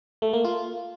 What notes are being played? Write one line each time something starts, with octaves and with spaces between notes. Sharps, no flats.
A3
A#3
F4